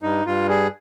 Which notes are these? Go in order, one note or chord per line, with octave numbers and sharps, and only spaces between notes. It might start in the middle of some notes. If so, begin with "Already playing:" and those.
G2 D#4
G2 F4
G3 G#4